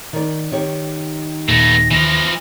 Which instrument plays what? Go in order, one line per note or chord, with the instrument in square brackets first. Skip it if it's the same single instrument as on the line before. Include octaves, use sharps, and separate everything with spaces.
[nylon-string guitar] D#3 D5
D#3 G4 C#5
[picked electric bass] D#2 A#2 [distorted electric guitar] A3 B3 [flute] A#6
[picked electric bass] D#2 [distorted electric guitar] E3 F3